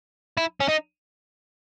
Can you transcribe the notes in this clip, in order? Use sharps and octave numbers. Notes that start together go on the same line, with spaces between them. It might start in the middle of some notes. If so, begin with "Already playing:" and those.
E4
C#4
D#4